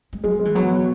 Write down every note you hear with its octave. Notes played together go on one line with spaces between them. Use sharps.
G#3
F#3 G#3
G#3
E3
F#3 B3
B2